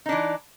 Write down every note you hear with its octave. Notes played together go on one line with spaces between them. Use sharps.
E3 D4 D#4